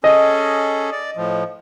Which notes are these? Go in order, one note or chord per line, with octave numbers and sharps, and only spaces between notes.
C#4 G#4 A4 D#5
D5
A2 F3